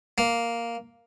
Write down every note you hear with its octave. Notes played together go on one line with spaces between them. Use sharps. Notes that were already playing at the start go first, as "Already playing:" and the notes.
A#3